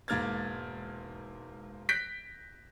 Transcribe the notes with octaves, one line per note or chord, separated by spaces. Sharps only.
E1 G#2 A#3 F6 G#6 A6
F#6 G6 A#6 B6 D7